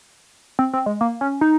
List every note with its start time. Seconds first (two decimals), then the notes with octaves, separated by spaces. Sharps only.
0.59 C4
0.73 C4
0.86 G#3
1.01 A#3
1.21 C#4
1.41 D#4